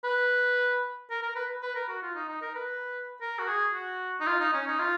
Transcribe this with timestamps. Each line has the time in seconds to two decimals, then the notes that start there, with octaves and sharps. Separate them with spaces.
0.04 B4
1.10 A#4
1.23 A#4
1.36 B4
1.63 B4
1.75 A#4
1.89 F#4
2.02 F4
2.15 D#4
2.29 D#4
2.42 A#4
2.55 B4
3.22 A#4
3.39 F#4
3.48 G#4
3.73 F#4
4.20 D#4
4.27 F4
4.41 D#4
4.54 C#4
4.67 D#4
4.80 F4